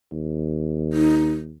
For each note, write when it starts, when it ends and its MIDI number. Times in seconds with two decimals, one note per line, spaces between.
0.12 1.56 39
0.93 1.32 63